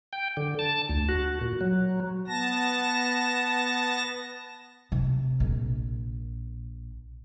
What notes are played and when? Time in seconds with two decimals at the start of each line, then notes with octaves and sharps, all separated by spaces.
0.13 G5
0.37 D3
0.59 A5
0.89 D2
1.09 F#4
1.41 A#2
1.61 F#3
2.27 B3 A5 A#6
4.92 C3
5.40 A#1